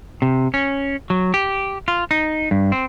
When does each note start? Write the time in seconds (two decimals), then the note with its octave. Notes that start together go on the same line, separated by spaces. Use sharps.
0.22 C3
0.54 C#4
1.10 F#3
1.34 G4
1.88 F4
2.11 D#4
2.51 G2
2.72 C4